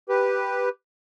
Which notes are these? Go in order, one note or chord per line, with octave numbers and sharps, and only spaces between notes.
G4 B4